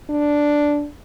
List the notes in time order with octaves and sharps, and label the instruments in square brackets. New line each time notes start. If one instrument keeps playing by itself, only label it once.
[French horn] D4